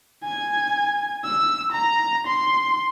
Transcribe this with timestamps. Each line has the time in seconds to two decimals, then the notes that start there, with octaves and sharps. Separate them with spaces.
0.25 G#5
1.25 E6
1.72 A#5
2.27 C6